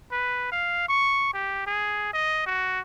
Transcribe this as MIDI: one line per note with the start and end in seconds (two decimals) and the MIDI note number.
0.11 0.47 71
0.52 0.86 77
0.88 1.30 85
1.34 1.66 67
1.67 2.09 68
2.13 2.45 75
2.46 2.80 66